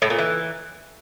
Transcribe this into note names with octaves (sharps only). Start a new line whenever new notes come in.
A2
A#2
E3